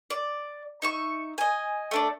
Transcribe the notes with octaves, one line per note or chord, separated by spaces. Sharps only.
D5
D#4 E5 C#6
D#5 G#5
A3 D4 D5